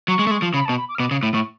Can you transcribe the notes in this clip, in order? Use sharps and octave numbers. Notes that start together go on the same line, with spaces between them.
F#3 C#6
G#3
A3
G#3
F3
C#3 B5
A5
B2
B5
D6
F6
B2 D6
C#3
A2
A2 C#6